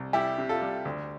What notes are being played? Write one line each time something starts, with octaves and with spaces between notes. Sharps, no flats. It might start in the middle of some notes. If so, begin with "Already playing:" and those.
Already playing: C2
G3 E4 G4
C3
F4 A4
G3
D2